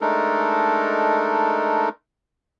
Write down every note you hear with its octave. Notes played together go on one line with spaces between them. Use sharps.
G#3 A3 D4 D#4 A4 A#4